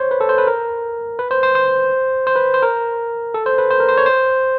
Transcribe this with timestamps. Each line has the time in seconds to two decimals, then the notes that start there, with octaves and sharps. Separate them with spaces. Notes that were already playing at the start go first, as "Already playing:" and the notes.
Already playing: C5 C#5
0.11 B4
0.21 A4
0.29 C5
0.38 B4
0.47 A#4
1.19 B4
1.31 C5
1.43 C5
1.55 C5
2.27 C5
2.36 B4
2.54 C5
2.63 A#4
3.34 A4
3.46 C5
3.58 B4
3.71 C5
3.80 A#4
3.88 C5
3.97 C#5
4.06 C5